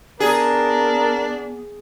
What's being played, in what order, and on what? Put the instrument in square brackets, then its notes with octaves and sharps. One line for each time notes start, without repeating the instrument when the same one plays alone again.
[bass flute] B3 [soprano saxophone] D4 [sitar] G#4 [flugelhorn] A#4